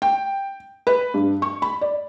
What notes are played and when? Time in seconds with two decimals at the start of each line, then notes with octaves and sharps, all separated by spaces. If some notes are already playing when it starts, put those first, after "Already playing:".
0.02 G5
0.87 B4
1.14 G2
1.42 C#6
1.62 B5
1.81 D5